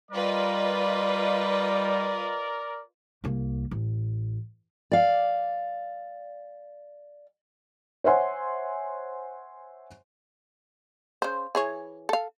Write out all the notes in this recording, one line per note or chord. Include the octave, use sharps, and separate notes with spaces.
G3 F4 A#4 B4 D5 D#5
C2 A#3
A1
D5 F5
C5 C#5 E5 F#5 G#5 C6
C#3 C5
E3 G#4 C#5
A4 F5